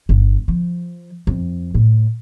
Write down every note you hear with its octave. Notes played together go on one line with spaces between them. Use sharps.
G1
F3
F2
A2